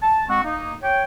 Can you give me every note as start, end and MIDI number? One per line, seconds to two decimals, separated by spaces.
0.01 0.27 81
0.28 0.41 56
0.28 0.41 60
0.28 0.41 66
0.28 0.41 78
0.28 0.41 85
0.44 0.73 58
0.44 0.73 63
0.83 1.04 73
0.83 1.04 79